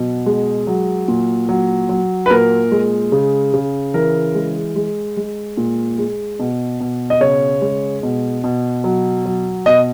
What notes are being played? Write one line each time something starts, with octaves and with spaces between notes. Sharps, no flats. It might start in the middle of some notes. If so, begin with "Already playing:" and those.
Already playing: B2 F#3
G#3
F#3
A#2
F#3
F#3
B4
A#2 A#4
G#3
C#3
C#3
E3 A#4
G#3
G#3
G#3
A#2
G#3
B2
B2
D#5
C#3 C#5
G#3
B2
B2
F#3
F#3
B2 D#5